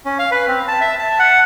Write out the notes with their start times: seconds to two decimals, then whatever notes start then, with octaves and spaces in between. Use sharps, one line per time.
0.05 C#4
0.19 F5
0.31 B4
0.48 C4
0.68 A5
0.81 E5
0.99 A5
1.19 F#5